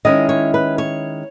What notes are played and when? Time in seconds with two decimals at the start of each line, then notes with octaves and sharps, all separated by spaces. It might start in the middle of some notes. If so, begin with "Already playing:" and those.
0.05 D#3 G#3 C#4 E4 D#5
0.29 C#5
0.54 B4
0.78 C#5